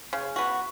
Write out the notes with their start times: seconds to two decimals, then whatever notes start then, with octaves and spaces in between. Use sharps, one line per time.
0.13 C#3
0.36 B3 F#4